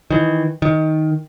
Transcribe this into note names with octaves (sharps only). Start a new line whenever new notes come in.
D#3 E3
D#3